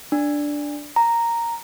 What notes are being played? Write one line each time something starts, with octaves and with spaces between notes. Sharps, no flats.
D4
A#5